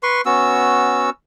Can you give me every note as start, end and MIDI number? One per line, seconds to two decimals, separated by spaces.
0.03 0.21 71
0.03 0.21 84
0.03 0.21 85
0.26 1.10 59
0.26 1.10 61
0.26 1.10 66
0.26 1.10 88